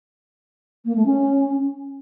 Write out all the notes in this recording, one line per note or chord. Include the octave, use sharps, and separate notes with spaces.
A#3
A3
C#4